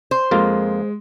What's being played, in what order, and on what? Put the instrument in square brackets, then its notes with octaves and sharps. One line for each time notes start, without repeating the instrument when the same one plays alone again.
[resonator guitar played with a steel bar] C5
[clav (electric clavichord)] F2 A#3 F4 [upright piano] G#3